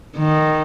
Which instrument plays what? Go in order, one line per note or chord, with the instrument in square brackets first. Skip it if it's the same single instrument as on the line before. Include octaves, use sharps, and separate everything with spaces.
[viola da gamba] D#3